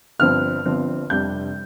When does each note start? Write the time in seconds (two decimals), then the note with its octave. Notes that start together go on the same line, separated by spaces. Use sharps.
0.19 G1 G2 F3 C4 F6
0.66 G1 G2 F3 C4
1.10 F1 F2 C3 G3 D4 G6